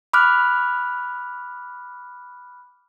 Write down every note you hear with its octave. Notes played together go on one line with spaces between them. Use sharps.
B5 D6 F6 F#6